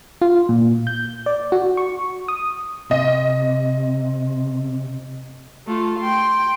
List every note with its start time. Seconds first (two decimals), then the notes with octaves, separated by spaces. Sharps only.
0.22 F4
0.49 A#2
0.87 G6
1.26 D5
1.52 F#4
1.77 C#6
2.28 D#6
2.91 C3 D#5
5.67 A3 F4
6.00 G5 C6